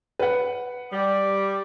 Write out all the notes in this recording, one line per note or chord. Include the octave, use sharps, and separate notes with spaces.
B4 F#5
G3 D6